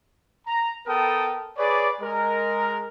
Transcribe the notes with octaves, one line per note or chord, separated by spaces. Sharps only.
A#5
B3 A4 A#4 G5 A5 D#6
G#4 B4 C#5 D5
G#3 A#4